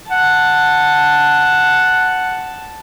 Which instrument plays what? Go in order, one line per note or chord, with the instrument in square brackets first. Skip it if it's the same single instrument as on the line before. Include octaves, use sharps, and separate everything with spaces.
[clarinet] F#5 [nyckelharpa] A5